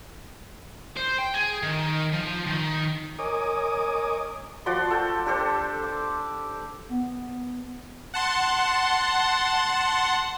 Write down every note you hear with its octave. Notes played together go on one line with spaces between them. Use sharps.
C5
G5
G#4
D#3
F3
D#3
A#4 C#5 D#5 G#5 D6 D#6
F3 F#4 D5 C6
A4 G5
D4 G4 A4 C5
D6
B3
F#5 A5 C6